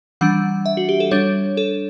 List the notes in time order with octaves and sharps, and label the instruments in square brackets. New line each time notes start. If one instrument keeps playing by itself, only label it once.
[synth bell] E3 G3 D4 F#5
E5
F#4
G4
A4
G3 D4 C#5
A4